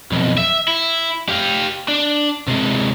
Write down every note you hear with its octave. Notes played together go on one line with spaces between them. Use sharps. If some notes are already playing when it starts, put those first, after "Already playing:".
B1 F2
E5
E4
G4 F5
D4
C3 G#3